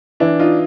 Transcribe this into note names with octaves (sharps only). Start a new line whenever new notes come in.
E3 D4 E4
D#4 F4